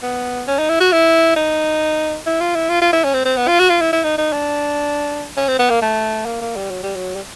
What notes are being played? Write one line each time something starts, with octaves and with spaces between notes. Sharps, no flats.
B3
C#4
D#4
E4
F#4
E4
D#4
E4
F4
E4
F4
F4
E4
C#4
C4
C4
B3
F4
F#4
F4
E4
E4
D#4
D#4
D4
C#4
C4
B3
A#3
A3
A#3
A#3
G3
F#3
G3
F#3
G3